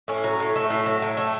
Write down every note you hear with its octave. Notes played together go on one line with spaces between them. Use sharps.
A2 C#4
F#3
A2
A3
A2
F#3
A2
A3